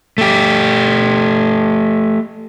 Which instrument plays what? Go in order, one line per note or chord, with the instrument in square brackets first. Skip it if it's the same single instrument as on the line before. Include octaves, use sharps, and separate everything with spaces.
[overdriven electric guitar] A3 G4